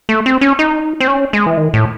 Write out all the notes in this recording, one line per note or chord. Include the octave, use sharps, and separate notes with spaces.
A3
C4
C#4
D#4
C4
C#4
G#3
E3
D#3
A2